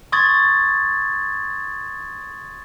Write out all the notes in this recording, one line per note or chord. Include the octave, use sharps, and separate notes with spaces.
C6 C#6 D#6 G#6 A6